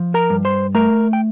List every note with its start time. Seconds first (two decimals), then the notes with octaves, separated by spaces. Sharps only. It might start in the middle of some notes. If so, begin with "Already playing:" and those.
Already playing: F3
0.14 A#4 A#5
0.30 G2
0.45 C5 C6
0.75 A3 A#4 A#5
1.13 G5